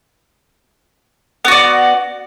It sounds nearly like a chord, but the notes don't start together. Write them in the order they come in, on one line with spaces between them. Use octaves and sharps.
B3 F#4 D5